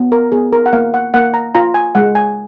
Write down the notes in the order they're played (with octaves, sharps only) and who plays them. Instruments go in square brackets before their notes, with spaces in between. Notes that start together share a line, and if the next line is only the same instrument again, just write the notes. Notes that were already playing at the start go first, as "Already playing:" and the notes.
Already playing: [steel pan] B3
A#4
B3 G#4
A#4
F#5
A#3 F5
F#5
A#3 F#5
A#5
F4 A#5
G#5
G#3 F#5
G#5